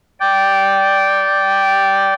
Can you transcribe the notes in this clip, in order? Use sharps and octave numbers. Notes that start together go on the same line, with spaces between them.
D5 G5